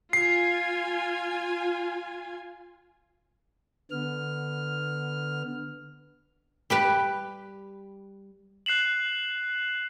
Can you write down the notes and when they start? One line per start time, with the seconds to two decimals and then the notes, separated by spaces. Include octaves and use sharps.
0.13 F4 G#5 C7
3.91 D3 B3 F6
6.70 G3 G4 B4
8.66 F#6 C7 E7 F#7